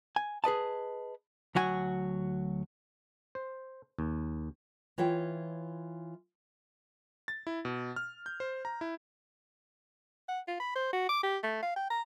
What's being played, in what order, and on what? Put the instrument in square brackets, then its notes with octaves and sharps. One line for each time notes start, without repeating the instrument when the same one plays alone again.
[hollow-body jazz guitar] G#5
G#4 B4 D#5 A5
D2 F#3 F#4 G#5
[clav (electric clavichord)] C5
D#2
[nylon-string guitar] E3 F4 C#5 E5 G5
[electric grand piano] A6
E4
B2
F6
G6
C5
A#5
E4
[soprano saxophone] F#5
F4
B5
C5
F#4
D6
G4
A3
F5
G5
A#5